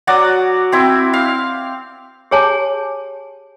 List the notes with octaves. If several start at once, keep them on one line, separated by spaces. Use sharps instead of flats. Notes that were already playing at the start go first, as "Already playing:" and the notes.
F#3 F#4 D5 D#6
C4 E4
F5
G4 G#4 C#5 G#5 A5